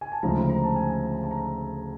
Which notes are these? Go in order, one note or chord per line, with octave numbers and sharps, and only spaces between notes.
G#5
A5
D2 C#3 F3 G#3 A#5
B5
A#5
A5
G#5
A5
A#5